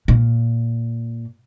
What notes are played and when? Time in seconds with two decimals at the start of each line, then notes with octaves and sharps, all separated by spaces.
0.08 A#2